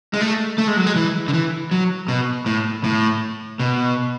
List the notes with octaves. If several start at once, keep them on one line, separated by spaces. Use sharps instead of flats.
G#3
A3
A3
G#3
F#3
G#3
E3
D3
E3
F#3
B2
A2
A2
B2